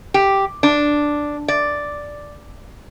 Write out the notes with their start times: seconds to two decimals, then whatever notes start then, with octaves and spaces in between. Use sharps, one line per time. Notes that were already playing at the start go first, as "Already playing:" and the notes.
0.14 G4
0.63 D4
1.48 D5